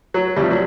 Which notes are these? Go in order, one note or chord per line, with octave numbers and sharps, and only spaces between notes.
F#3
D2 C3 F3 G3
F#3